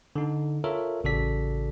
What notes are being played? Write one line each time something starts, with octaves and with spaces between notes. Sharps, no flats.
D3 D#4
F4 A4 A#4 C#5 E5
A1 C#3 F#4 A4 D5 B6